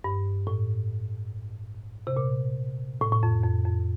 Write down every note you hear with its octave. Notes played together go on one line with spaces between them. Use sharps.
G2
A2
C3
A#2
A2
A2
F2
F2
F2